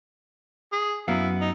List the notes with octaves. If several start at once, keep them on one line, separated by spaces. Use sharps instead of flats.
G#4
F#2 B3 E4 F5
D#4